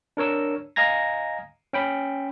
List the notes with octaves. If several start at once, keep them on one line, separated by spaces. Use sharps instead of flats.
D4 A#4 C#5 E6
D#5 F5 G#5 A#5 G#6 A#6
C#4 G5 B5